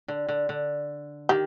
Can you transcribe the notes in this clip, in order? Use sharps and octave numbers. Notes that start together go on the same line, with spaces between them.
D3
D3
D3
D#3 G4